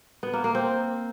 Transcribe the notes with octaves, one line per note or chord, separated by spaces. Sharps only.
B3
A#3
A#3
C4